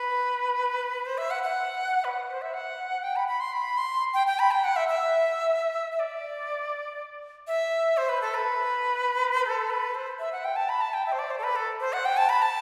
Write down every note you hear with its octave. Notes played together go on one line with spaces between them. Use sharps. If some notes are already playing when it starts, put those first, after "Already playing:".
Already playing: B4
C5
E5
F#5
F#5
B4
C5
E5
F#5
G5
B5
B5
C6
B5
C6
G5
G5
B5
G5
F#5
E5
E5
E5
D5
E5
C5
B4
A4
B4
A4
B4
C5
E5
F#5
G5
A5
B5
A5
G5
E5
C5
D5
C5
A4
B4
A4
C5
F#5
G5
A5
B5
A5